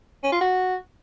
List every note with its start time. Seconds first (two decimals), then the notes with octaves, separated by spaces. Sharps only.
0.24 C#4
0.32 F4
0.41 F#4